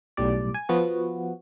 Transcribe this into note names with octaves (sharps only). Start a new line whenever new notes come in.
B1 A2 G3 D5
G#5
F3 B3 F#4